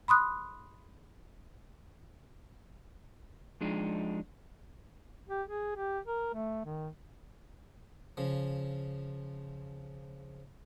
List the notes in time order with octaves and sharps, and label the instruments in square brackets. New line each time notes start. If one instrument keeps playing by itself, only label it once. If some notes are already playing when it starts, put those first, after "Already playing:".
[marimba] B5 C6 D#6 F#6
[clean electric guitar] F3 G#3 D4 D#4
[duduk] G4
G#4
G4
A#4
A3
D#3
[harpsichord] C#3 F3